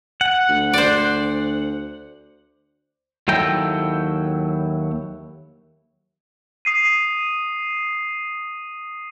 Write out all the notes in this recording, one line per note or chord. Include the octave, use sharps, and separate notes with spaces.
F#5
D2
C5 D5
D#2 F#3 E4 A4 G5 A#5
D#6 C7 D#7